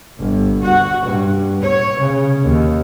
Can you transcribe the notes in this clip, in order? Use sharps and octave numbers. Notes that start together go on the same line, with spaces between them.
G1
F#4
G2
C#5
C#3
D#2